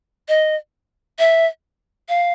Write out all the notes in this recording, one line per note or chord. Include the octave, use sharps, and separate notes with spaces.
D#5
E5
F5